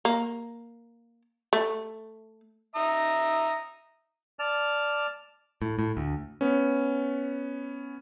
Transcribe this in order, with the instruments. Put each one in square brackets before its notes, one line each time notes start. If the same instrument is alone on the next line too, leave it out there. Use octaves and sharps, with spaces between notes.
[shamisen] A#3
A3
[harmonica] E5 A#5 D#6
[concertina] D5 A5 F6
[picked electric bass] A2
A2
D2
[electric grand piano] B3 C#4